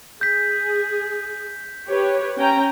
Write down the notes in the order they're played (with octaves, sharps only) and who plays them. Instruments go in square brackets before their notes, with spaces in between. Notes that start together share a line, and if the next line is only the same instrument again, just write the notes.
[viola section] G#4 [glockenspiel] G6 B6
[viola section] G4 B4 C#5
C#4 G5 A#5